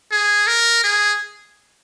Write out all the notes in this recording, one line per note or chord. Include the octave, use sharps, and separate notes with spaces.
G#4
A#4
G#4